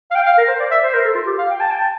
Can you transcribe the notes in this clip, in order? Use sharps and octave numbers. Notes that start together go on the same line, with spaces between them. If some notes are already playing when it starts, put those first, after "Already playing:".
F5
G5
F5
A#4
C5
D5
E5
C5
A#4
A4
F4
G4
F5
G5
A5
G5
A5